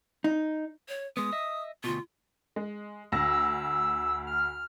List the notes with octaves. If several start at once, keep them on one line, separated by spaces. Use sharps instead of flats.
D#4
C#5
G#3 B3 D#6
D#5 E5
D2 B2 F4
G#3
D2 E6 A#6
F6